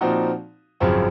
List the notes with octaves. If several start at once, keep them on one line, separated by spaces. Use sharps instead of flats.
A#2 F3 C4 D#4 F#4
G#1 F#2 C#3 F3 C4